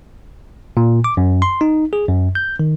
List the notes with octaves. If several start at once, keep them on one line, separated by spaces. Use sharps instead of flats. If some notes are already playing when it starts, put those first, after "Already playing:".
A#2
D6
F#2
C6
D#4
G#4
F#2
G6
D#3